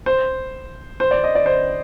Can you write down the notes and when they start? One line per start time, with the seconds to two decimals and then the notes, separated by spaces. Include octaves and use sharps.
0.06 C5
1.00 C5
1.11 D5
1.24 D#5
1.35 D5
1.46 C5